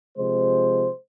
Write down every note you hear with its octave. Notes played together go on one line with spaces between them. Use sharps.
C3 F3 G#3 C5